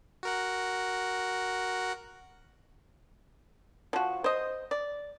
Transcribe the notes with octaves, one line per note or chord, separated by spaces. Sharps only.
F#4 A#4 F#5
F3 F#4
C5 D#5
D5